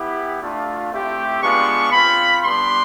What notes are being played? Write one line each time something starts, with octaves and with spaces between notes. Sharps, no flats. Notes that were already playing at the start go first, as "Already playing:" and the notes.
Already playing: B3 E4 G4
A3 D4 F4
A3 C4 E4 G4
G#3 B3 D4 F4 C#6
C4 F4 B5
G3 B3 D4 G4 C6